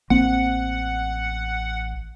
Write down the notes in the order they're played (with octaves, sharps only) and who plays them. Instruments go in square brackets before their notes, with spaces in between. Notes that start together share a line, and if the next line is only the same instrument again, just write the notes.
[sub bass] A1 [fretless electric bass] A#3 C4 [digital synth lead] F#5